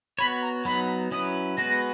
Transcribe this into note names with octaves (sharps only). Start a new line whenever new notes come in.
B3 F#4 C#5 B5
A#5
F#3 B3 D#4 B5
F#3 C#4 E4 B4 D#6
G#3 B3 F#4 B4 A#6
A#6